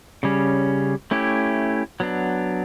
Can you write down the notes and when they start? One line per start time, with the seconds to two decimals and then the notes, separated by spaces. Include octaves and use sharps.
0.23 C#3 G3 C#4
1.11 A3 C#4 E4 G4
2.00 F#3 B3 D4